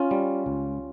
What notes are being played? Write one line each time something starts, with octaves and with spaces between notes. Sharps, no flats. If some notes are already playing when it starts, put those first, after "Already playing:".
Already playing: C#4 F4
G3
C#2